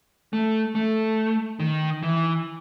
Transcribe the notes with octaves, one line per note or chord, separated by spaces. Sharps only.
A3
A3
D#3
E3